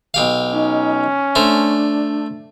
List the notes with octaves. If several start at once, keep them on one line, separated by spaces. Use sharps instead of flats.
B1 G4 F5
C#4 D#4
A3 D4 C5 A#5